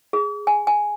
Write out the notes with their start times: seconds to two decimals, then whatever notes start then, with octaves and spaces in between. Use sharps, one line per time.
0.13 G#4
0.47 G#5
0.67 G#5